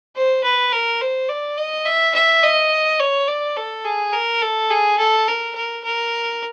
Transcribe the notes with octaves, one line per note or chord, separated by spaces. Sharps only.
C5
B4
A#4
C5
D5
D#5
E5
E5
D#5
C#5
D5
A4
G#4
A#4
A4
G#4
A4
A#4
A#4
A#4